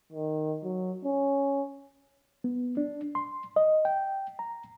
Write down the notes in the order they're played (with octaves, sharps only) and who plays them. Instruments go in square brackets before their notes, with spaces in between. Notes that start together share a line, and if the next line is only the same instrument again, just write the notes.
[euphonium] D#3
F#3
C#4
[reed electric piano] B3
D4
C6
D#5
G5
A#5